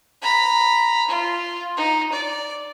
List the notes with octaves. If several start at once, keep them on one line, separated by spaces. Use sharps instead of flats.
A#5 B5
F4
D#4
D5